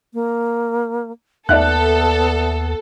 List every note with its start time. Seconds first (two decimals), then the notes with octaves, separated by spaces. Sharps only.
0.14 A#3
1.49 D#2 B3 A4 D5 E5 F#6